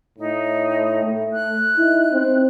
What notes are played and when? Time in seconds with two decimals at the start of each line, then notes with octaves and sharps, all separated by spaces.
0.19 A2 D#4
1.04 A3
1.33 F#6
1.77 D#4 E4
2.12 C4